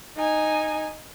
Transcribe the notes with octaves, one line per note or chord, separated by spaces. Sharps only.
D#4 G#5